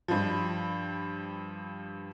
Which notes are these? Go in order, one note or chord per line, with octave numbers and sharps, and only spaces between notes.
G2 F3